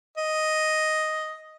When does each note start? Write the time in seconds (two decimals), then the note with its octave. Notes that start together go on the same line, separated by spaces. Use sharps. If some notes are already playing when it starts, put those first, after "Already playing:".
0.18 D#5